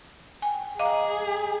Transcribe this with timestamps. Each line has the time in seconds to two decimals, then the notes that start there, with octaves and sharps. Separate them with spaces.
0.42 G5 G#5
0.79 G#4 D#5 F5 A#5 D6
1.15 G#5